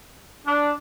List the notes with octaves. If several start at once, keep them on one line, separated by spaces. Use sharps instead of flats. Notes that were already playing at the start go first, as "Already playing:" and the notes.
D4